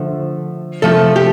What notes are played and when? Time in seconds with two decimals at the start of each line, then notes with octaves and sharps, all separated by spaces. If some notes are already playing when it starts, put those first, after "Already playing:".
Already playing: D3 F3 A3
0.82 C3 F3 A3 A4
1.16 G4